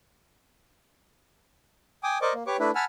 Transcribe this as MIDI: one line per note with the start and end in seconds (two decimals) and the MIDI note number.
2.03 2.18 79
2.03 2.18 80
2.03 2.18 86
2.03 2.18 87
2.22 2.33 70
2.22 2.33 72
2.22 2.33 74
2.22 2.33 75
2.22 2.33 85
2.22 2.33 86
2.34 2.43 58
2.47 2.57 67
2.47 2.57 71
2.47 2.57 73
2.47 2.57 85
2.47 2.57 86
2.59 2.71 57
2.59 2.71 62
2.59 2.71 64
2.59 2.71 71
2.75 2.85 78
2.75 2.85 80
2.75 2.85 81
2.75 2.85 83
2.75 2.85 88
2.75 2.85 89